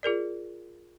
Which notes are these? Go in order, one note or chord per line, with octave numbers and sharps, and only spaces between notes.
F4 G#4 A#4 D5